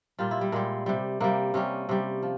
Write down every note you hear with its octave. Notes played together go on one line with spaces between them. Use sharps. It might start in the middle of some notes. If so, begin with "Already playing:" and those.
A#2 G3 F4
E4
G3
A#2 G3 G#3
C3 G3
C3 G3 A#3
C3 G3 C#4
C3 G3
F3